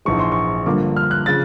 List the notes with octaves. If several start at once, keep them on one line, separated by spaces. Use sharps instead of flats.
A#1 G#2 E3 G#3 C#6
C6
C#6
G2 D3 F3 A#3 D6
F6
F#6
C#3 F3 A6